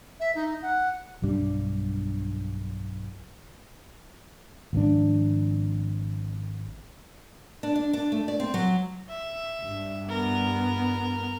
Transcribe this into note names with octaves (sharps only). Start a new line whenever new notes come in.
E5
D#4
F#5
B1 G2 G3 D4
G#1 F3 C4 D4
D4
D4
D4
A3
D5
C4
F#3
E5
G2
B3 A#4